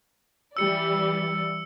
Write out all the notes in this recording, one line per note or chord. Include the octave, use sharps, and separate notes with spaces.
E3 G3 D5 E6 C#7